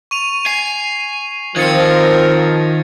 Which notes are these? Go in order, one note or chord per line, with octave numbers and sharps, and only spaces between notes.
C#6 D#7 F7
G#5 C7
D#3 F3 C4 A#4 G#6 A6 C#7